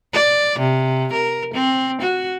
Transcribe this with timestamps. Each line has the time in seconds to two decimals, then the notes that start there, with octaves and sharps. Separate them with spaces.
0.13 D5
0.59 C3
1.13 A#4
1.54 C4
2.01 F#4